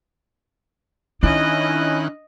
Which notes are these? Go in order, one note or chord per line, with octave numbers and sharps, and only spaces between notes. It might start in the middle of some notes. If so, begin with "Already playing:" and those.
D#3 C#4 D4 E4 D#5 F#6